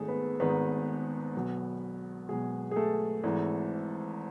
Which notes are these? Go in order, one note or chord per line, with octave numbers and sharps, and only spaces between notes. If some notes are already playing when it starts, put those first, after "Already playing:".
Already playing: G#1 G#2 D#3 G#3 A3 G#4 A4
B3 B4
G#1 G#2 D#3 B3 B4
B1 B2
B1 B2 G#3 G#4
G#4
A3 A4
G#1 G#2 E3